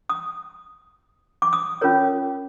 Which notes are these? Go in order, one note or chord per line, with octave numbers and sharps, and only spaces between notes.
D#6
D6
D#6
C#4 F4 A#4 C#5